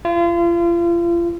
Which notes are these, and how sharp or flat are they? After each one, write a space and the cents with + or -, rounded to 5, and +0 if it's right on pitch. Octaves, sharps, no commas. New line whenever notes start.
F4 -35